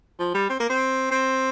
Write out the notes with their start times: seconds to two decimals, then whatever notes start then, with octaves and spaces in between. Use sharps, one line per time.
0.19 F3
0.35 G3
0.50 C4
0.60 A#3
0.69 C4
1.11 C4